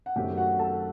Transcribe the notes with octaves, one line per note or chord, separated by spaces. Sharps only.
F#5
F#2 D#3 A3 C4 G4 G5
F#4 F#5
A4 A5